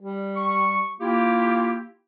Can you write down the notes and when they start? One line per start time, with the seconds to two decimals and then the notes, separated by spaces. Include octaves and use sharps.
0.01 G3
0.36 C#6
1.00 A#3 E4 F4 G4